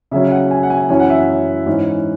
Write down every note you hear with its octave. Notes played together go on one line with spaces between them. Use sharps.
C#3 F#3 C#4 E5
F#5
G#5
F#5
G#5
F#2 E3 C#4 G#5
F#5
E5
F#5
G#2 E3 C#4